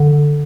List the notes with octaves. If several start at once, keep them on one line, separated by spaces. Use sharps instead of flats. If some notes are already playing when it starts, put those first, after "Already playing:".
Already playing: D3